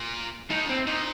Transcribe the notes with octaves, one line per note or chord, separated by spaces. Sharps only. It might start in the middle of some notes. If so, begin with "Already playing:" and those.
Already playing: A#2
A2 D#4
C4
A#2 D#4